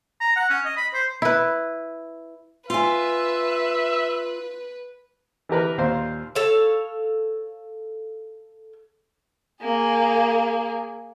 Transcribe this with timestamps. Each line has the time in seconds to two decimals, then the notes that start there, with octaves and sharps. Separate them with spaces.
0.21 A#5
0.36 F#5
0.50 C#4
0.65 D#5
0.77 B5
0.94 C5
1.22 E4 B4
2.70 F4 B4 E5 G#5
5.49 E3 G4 A#4 B4
5.78 D#2 A#2 C5 F5
6.35 A4 C#5 F5
9.62 A#3 G#4